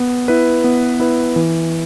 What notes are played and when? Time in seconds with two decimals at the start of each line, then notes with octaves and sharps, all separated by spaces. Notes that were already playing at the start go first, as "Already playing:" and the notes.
Already playing: B3
0.28 E4 B4
0.64 B3
1.00 E4 B4
1.36 E3